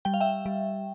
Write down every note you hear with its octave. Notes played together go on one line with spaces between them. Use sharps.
G3 G5
F5
E5 G5
G3